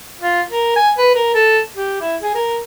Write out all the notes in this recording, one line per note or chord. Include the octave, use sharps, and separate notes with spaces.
F4
A#4
G#5
B4
A#4
A4
G4
E4
G#4
A#4